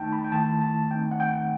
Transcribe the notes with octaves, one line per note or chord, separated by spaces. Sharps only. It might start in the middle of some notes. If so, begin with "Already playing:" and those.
Already playing: D#3 A3 D#4 G5 A5
B5
G5
D#3 A3 E4 A5
A5
D#3 A3 C4 D#4 G5
F#5
G5